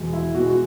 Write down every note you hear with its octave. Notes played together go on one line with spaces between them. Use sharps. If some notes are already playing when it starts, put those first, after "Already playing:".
Already playing: E2 B2 G#3
E4
B2 G#3 F#4
F#4